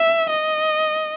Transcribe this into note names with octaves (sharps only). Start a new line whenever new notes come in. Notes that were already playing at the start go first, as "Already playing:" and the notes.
Already playing: E5
D#5